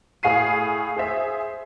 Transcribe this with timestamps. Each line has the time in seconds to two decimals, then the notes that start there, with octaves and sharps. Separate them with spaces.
0.23 A2 G#4 F5 C#6 C7 D#7
0.96 G#4 C5 E5